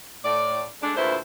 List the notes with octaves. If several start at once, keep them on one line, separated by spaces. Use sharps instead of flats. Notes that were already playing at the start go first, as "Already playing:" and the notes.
A2 D5
G#3 A3 D4
D2 A#2 E4 B4 C5